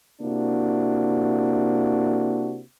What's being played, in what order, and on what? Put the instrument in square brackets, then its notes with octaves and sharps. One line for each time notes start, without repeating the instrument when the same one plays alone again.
[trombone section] C3 A#3 D4 E4 F#4